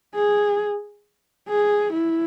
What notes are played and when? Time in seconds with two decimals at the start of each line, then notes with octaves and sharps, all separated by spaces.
0.15 G#4
1.48 G#4
1.93 E4